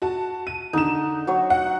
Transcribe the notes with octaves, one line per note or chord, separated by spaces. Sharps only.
F#4 A5
D#7
D3 D#4 E7
F#3 C#5
F#5